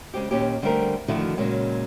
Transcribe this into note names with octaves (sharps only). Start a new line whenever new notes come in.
C#3 G#3 C4 G4
D#2 A#2 C#4 D#4 G4
D3 G3 A3 C4 A4 A#4
D3 D#3 F3 A3 E4 F#4
A#2 C#3 F#3 G#3 A#3